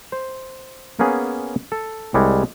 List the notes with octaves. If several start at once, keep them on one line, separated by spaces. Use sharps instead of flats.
C5
A#3 B3 C#4 G#4
A4
C2 G3 G#3 C#5